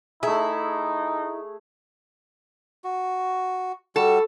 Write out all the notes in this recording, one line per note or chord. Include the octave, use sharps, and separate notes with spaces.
A3 D#4 E4 G#4
F#4
G3 F#4 A4